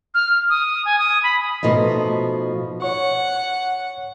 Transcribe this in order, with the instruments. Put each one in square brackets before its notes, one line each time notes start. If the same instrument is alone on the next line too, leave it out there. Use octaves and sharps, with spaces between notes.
[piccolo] F6
D#6
G#5
D#6
B5
[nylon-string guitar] B2 F3 A3 D#4
[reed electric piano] C#5 C#6 [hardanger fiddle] F#5